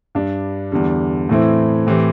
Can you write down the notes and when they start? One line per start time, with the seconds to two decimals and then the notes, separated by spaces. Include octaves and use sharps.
0.15 G2 G3 D4
0.72 E2 D3 G3
1.29 A2 E3 A3 C4 E4
1.87 A2 E3 C4 G4 C5